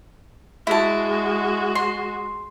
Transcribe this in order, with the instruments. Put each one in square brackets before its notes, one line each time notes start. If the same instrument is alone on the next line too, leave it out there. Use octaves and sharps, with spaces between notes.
[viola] G#3 F#4 [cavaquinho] E4 A5
[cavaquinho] C6